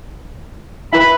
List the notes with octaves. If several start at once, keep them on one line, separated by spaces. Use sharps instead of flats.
E4 B4 B5